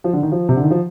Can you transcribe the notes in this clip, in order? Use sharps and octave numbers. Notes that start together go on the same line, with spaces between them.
F3
D3
D#3
F3
C3
D3
D#3
F3